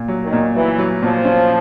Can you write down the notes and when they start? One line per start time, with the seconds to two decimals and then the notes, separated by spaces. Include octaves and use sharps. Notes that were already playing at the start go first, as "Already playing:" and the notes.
Already playing: A#2
0.08 F#3
0.24 D#3
0.33 A#2
0.55 E3 F#3
0.78 F#3
1.02 A#2 F3
1.25 C#4